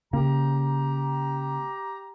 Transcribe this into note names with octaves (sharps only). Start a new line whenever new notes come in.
C#3 A#3 G4 A#5